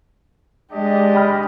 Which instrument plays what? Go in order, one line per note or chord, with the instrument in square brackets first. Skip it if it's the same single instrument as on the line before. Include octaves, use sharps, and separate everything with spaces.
[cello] G#3 G4 [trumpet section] D4 D5 D#5
[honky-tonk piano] G5 B5 F6